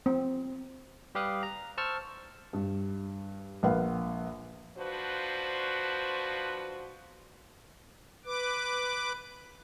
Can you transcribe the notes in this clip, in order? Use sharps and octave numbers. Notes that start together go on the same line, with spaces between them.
C4
G3 G4 B4 F5 D#6 F#6
A#5
C5 A5 C#6 E6 F6
G2
A#1 A#4 B4 F5 F#5
F3 D4 F#4 B4 C5
B4 D6